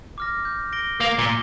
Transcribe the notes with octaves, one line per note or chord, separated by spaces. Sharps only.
D6 F6 A#6
G6
A#6 D7 G7
A#3 D6
A#2
G7